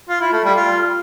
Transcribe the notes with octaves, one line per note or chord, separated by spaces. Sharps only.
F4
E4
A3
G3
F4